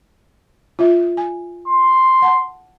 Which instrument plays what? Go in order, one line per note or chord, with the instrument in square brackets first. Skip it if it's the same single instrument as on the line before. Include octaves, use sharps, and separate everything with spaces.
[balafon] F4 E5
G#5
[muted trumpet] C6
[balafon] F#5 A5